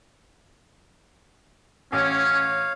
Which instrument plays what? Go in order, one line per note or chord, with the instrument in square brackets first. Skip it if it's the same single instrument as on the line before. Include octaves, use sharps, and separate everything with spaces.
[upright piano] A1 [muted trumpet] C#4 [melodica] C#5 F5